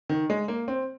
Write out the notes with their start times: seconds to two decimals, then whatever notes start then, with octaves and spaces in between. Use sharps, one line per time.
0.09 D#3
0.30 G#3
0.48 A#3
0.68 C4